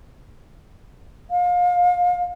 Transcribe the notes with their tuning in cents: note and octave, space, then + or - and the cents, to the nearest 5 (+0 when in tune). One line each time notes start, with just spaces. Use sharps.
F5 +30